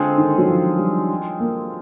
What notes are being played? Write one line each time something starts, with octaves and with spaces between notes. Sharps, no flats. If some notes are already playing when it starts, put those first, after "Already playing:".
Already playing: D3 G#3 C4 F4 A4
D#3
F#3
F3
G3
A#3